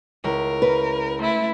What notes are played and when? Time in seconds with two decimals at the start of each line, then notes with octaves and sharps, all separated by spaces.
0.24 C#2 E4 A#4
0.62 B4
1.19 A3 E4 C6